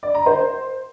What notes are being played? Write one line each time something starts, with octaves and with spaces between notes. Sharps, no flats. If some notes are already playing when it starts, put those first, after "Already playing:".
D5
A#5
C5